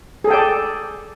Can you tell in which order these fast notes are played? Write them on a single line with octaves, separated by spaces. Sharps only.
G#4 A4 G5 D5